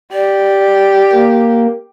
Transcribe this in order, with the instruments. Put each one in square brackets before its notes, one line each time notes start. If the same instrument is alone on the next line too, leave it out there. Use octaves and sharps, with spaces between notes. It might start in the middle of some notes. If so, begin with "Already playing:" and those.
[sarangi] G4 [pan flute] D5
[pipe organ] A#3